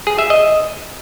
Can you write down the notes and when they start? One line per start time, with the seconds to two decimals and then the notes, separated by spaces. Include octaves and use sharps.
0.07 G#4
0.19 E5
0.30 D#5